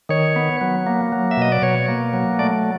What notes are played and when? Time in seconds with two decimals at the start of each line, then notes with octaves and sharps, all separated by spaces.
0.09 D#3 C#5
0.36 B3
0.61 F#3
0.87 A#3
1.12 F#3
1.31 E5
1.37 B2 D#5
1.52 D5
1.62 B2 C#5
1.88 A#3
2.13 F#3
2.39 A3 D5